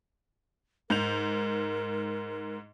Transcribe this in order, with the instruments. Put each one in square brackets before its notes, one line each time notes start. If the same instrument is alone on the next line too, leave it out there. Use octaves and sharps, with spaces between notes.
[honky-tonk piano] G#2 G6 F7 [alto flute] A#4